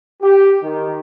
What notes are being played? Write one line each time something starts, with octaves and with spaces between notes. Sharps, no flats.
G4
D#3